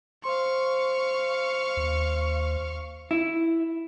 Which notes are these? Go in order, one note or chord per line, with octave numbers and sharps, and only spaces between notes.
C5 F5 C6 C#6
D#2
E4